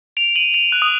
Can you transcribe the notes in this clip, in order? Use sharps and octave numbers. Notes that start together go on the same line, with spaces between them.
D7 F7
D#7 F#7
D7 F7
F#6
D#6